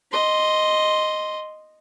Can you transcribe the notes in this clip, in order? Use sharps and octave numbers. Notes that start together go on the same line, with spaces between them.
D#5 C6